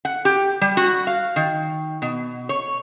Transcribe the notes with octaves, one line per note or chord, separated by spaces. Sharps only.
F#5
G4
G3
F#4
F5
D#3
B2
C#5